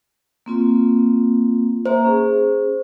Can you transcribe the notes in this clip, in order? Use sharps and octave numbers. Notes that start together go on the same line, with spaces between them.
A#3 C4 F4
A#3 C5 E5 A#5
C#4 G#4